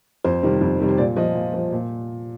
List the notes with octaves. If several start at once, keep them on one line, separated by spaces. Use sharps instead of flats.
F2 C5
C3 D#3 G3
F2
C3 D#3 G3
C5
A#2 D5
F3 D#5
A#2
F3
A#2